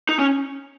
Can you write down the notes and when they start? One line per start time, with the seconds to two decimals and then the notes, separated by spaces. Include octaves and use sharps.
0.09 D#4
0.19 C#4